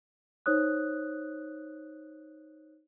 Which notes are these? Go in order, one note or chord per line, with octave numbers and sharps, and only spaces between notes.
D#4 C5 C#5 D#6 F#6